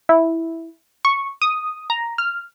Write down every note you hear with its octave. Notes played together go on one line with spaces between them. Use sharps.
E4
C#6
D#6
A#5
F6